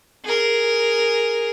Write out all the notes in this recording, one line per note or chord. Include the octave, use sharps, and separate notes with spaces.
G#4 A#4